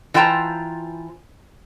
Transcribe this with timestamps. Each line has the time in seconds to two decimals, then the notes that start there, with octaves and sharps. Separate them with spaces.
0.14 E3 F4 C5 G5 A5 A#5